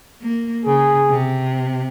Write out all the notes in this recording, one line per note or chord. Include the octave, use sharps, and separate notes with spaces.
A#3
C#3 G#4
C3